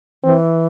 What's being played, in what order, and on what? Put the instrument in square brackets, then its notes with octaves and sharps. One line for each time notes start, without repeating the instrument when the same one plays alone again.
[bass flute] E3 [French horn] C4